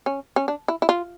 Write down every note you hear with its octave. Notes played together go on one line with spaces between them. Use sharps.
C#4
C#4
D4
E4
E4
F4